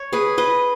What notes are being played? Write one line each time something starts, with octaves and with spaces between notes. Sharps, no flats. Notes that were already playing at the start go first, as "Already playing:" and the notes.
Already playing: C#5
G#4 B4
B4 D#5